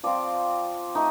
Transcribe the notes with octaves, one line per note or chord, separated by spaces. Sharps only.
F3 C4 F4 D5
A3 D#4